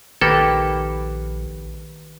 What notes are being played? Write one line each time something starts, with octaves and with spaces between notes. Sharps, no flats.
A#1 D#3 A#3 G4 A4 B4